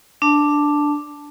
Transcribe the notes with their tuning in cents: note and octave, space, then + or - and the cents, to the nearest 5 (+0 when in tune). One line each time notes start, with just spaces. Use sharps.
D4 +0 A5 +0